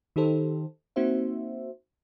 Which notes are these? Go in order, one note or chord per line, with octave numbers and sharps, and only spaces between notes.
D#3 D#4 G4 A4 C5
A#3 C4 D#4 F#4 C5 E5